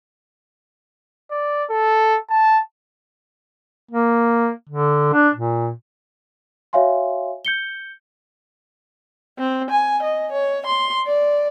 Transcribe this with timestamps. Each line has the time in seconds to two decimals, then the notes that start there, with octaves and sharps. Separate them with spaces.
1.31 D5
1.70 A4
2.29 A5
3.91 A#3
4.69 D3
5.13 D4
5.35 A#2
6.73 F#4 C#5 E5 F5 G#5 C6
7.45 G6 C#7 G7
9.38 C4
9.71 G#5
10.03 D#5
10.32 C#5
10.66 C6
11.07 D5